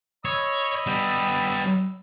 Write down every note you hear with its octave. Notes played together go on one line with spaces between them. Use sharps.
C#5 D#5 B5 E6
G3 B3